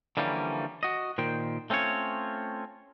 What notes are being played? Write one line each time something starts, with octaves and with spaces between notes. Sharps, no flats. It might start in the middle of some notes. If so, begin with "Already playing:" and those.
D3 E3 F3 G3 A#3 C#4
F#4 D#5
A#2 D#3 C5 G5
A3 C4 C#4 F4 C#5